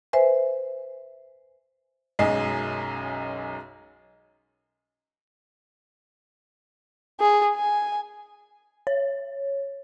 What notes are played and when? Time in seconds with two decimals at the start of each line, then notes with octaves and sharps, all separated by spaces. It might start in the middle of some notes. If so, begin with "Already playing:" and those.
0.13 B4 C5 E5 G#5
2.19 B1 F#2 G#3 D#5 G#5 C7
7.20 G#4
7.56 G#5
8.87 C#5